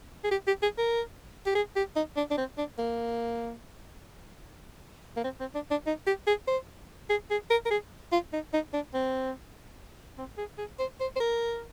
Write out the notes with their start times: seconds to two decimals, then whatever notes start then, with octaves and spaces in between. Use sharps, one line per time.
0.24 G#4
0.31 G4
0.47 G4
0.63 G#4
0.78 A#4
1.46 G4
1.55 G#4
1.76 G4
1.96 D#4
2.17 D4
2.31 D4
2.38 C4
2.58 D4
2.78 A#3
5.17 A#3
5.24 C4
5.40 C4
5.55 D4
5.71 D4
5.86 D#4
6.07 G4
6.27 G#4
6.48 C5
7.10 G#4
7.30 G#4
7.50 A#4
7.65 A#4
7.71 G#4
8.12 F4
8.33 D#4
8.53 D#4
8.74 D4
8.94 C4
10.18 C4
10.38 G#4
10.58 G#4
10.79 C5
11.00 C5
11.16 C5
11.20 A#4